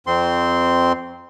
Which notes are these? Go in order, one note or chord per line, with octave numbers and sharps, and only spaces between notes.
F2 C4 C6